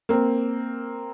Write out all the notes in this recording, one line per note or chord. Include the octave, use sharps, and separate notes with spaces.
A#3 C4